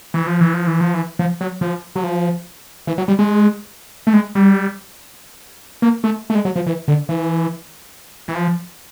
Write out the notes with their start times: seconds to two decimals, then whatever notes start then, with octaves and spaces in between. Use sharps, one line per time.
0.14 E3
0.27 F3
0.41 E3
0.54 F3
0.67 E3
0.81 F3
0.94 E3
1.19 F3
1.41 F#3
1.61 F3
1.96 F#3
2.04 F3
2.87 E3
2.98 F#3
3.08 G3
3.19 G#3
4.07 A3
4.13 G#3
4.35 G3
5.82 A#3
6.04 A3
6.30 A3
6.35 G#3
6.45 F#3
6.56 F3
6.67 E3
6.88 D3
7.09 E3
8.28 E3
8.35 F3